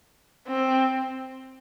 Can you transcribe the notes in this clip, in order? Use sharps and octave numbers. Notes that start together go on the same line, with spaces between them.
C4